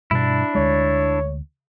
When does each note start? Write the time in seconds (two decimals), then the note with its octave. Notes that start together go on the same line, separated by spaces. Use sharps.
0.11 G2 B2 D4 E4
0.55 D2 G#3 C#5